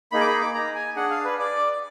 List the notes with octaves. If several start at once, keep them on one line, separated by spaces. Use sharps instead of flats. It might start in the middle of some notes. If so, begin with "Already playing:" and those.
A#3 D#4 G#4 B5
D6
B5
D6
A#5
G#5
D4 G#4 F#5
F5
B4
D5